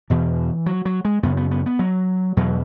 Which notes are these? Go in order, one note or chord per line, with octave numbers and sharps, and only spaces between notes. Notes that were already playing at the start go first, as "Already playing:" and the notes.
E2 B2 E3
F#3
F#3
G#3
F#2 C#3 B3
B3
B3
B3
F#3
E2 B2 F#3